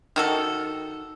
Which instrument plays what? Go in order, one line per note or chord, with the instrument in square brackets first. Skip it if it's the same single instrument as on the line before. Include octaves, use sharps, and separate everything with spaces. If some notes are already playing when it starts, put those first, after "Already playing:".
[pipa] D#3 F#4 A4